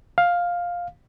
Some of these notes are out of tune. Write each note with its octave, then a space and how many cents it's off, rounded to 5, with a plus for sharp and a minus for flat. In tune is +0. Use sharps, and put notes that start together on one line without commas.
F5 +10